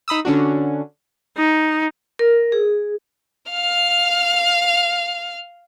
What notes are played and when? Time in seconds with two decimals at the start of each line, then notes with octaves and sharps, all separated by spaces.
0.08 D#4 B5 D#6 E6
0.25 D3 C#4 D4 F#4
1.37 D#4
2.19 A#4
2.52 G#4
3.52 F5 F6